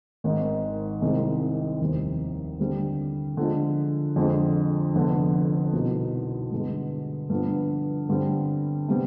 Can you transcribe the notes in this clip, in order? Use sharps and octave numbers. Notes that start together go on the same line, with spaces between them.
G#1 G#2 D#3
C2 C3 D#3 G#3
F1 D#2 D#3 G3 C4
D3 G3 C4
D3 F3 G#3
F2 D3 G#3 C4
F1 F2 D3 G#3 B3
C2 B2 B3 D#4
G2 D3 G#3 B3
G2 D3 F3 B3
G2 D3 G3 C4
C3 G3 B3